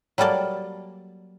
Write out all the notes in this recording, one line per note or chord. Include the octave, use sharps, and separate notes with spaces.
F#3 G3 A#3 A4 D5